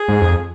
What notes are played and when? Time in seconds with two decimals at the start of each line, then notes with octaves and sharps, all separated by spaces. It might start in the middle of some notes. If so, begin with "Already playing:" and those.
Already playing: G#4
0.08 G#2
0.21 F2